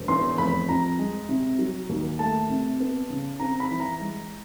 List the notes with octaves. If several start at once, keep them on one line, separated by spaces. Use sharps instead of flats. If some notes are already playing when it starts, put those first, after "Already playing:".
Already playing: E1
E2 C6
F1 B5
F2 A#5
G#3
C3
F#3
D#2
A3 A5
C3
B3
C#3
C4 A#5
B5
E3
A#5
G#3